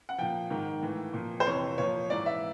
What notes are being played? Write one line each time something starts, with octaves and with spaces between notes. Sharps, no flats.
F#5
A#2 F3 G5
G#2 D#3
A2 E3
A#2 F3
C5
F2 C3 E3 C#5
A#2 F3 C#5
G#2 E3 D5
E5